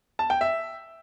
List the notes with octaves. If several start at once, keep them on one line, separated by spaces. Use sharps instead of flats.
A5
G5
E5